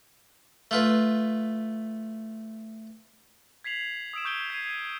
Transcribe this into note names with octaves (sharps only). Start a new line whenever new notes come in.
A3 F4 B4
G#6 B6 C7 F7 F#7
D#6 E6 D7 E7
C#6 G6 D7 G7
G#6 C7 D#7